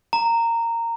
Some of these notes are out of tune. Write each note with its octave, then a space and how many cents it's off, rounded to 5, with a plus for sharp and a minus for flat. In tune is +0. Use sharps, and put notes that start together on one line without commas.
A#5 -15